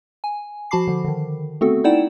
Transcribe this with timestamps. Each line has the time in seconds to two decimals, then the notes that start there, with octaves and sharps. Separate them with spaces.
0.24 G#5
0.71 F3 F#4 A5 B5 D6 C7
0.87 D3 F3
1.04 D3 D#3
1.61 A3 B3 C4 F#4 A4
1.84 D#4 E4 D5 F#5 G5 E7